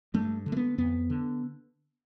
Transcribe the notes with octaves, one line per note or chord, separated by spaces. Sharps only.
G2 A3
D3
A3
B3
F2 B3
D3